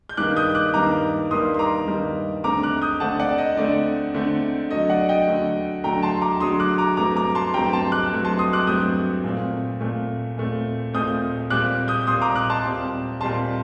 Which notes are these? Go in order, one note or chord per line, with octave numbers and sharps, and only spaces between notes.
G6
G2 D#3 G3 A#3 D6 F#6
D#6 G6
D6 F#6
G2 D#3 G3 A#3 A#5 D6
G2 D#3 G3 A#3 C6 D#6
C6
A#5 D6
G2 D#3 G3 A#3
D3 A3 C4 A#5 D6
D6 F#6
D#6 G6
D3 A3 C4 F#5 A5
D5 F#5
D#5
D3 A3 C4 D5
D3 A3 C4
D3 F#3 A3 D#5
D5 F#5
D#5 G5
D3 F#3 A3
D3 F#3 A3 G5 A#5
A5 C6
A#5 D6
D3 F#3 A3 C6 D#6
D6 F#6
A#5 D6
G2 F#3 A3 C4 A#5 D6
A#5 D6
A5 C6
G2 F#3 A3 C4 G5 A#5
A5 C6
D6 F#6
G2 F#3 A3 C4
A5 C6
C6 D#6
D6 F#6
G2 F#3 A3 C4 D#6 G6
A#2 A3 C4
A#2 A3 C4
A#2 A3 C4
A#2 A3 C4 D#6 G6
A#2 G3 C4 D6 F#6
D#6 G6
A#2 G3 C4 C6 D#6
A#5 D6
D6 F#6
A5 C6
A#2 G3 C4
A#2 G3 C4 A5 C6